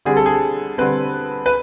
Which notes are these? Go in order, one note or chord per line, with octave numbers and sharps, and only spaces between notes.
D3 G3 C4 G#4
A4
G#4
D3 G3 C4 B4
B4